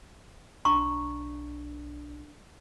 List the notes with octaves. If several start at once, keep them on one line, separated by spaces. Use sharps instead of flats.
B1 D4 A#5 C#6